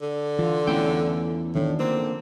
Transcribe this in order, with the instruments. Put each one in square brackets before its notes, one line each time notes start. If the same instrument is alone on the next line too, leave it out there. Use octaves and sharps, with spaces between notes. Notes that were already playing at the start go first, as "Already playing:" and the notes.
[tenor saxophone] D3
[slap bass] E3 [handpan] F4
[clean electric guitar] E2 E4 G5 [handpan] A3 C#4
[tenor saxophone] A2 [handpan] D#3 F3 D4
[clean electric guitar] D3 A#3 [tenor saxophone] C4